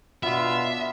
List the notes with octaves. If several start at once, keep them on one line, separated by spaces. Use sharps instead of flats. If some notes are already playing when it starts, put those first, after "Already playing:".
B2 B3 D4 F4 E5